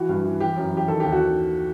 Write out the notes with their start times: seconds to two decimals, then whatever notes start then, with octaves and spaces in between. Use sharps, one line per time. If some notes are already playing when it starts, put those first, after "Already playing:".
Already playing: E3 F#4
0.09 G2
0.25 E3
0.40 E3 G4
0.56 F#2
0.72 E3
0.77 G4
0.88 D#3 A4
1.00 D#2 G4
1.12 F#4
1.20 D#3